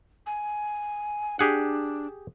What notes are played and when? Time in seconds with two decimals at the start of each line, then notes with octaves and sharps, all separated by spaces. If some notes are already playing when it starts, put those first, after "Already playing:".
0.26 G#5
1.39 D4 G4 G#4 F#5